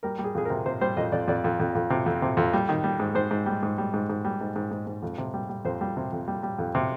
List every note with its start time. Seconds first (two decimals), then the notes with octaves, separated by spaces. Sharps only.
0.03 G3 A#4
0.18 G3
0.24 G#4
0.35 F2 G#4
0.45 C3 A#4
0.66 C3 C5
0.81 G3 C5
0.97 F2 D#5
1.12 F2 D5
1.28 F2 D5
1.44 F2
1.60 F2
1.75 F2
1.90 C3
2.06 F2
2.22 C3
2.37 F2
2.53 G3
2.69 D#3
2.84 G3
3.00 G#2
3.15 G#2 C5
3.31 G#2
3.46 G3
3.63 G#2
3.78 G3
3.94 G#2
4.10 G#2
4.25 G3
4.41 G#2
4.56 G#2
4.71 G#2
4.87 G#2
5.03 F2
5.18 C3
5.34 G3
5.49 G3
5.65 F2 C5
5.81 G3
5.97 C3
6.13 F2
6.28 G3
6.43 G3
6.59 F2
6.75 C3